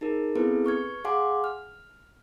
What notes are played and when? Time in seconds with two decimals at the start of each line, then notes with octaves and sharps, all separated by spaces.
0.01 D#4 G#4 A#4
0.35 B3 C4 E4 G#4 A4 B4
0.65 B4 C#6 F6 G#6
1.04 G#4 F5 F#5 G#5 C6 D6
1.44 F6